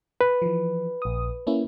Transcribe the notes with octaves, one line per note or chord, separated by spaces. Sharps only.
B4
E3 F3
A#1 D#6
A#3 C#4 E4